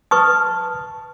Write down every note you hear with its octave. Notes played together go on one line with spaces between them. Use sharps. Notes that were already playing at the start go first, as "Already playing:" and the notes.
B4 A5 C#6 D#6 F6